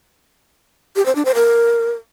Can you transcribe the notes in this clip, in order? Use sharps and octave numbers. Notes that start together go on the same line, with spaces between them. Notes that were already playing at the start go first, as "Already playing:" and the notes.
G4
C5
D4
C5
A#4